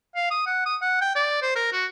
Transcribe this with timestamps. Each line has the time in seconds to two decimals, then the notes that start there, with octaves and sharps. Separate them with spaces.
0.16 F5
0.31 D#6
0.46 F#5
0.66 D#6
0.82 F#5
1.01 G5
1.16 D5
1.42 C5
1.56 A#4
1.73 F#4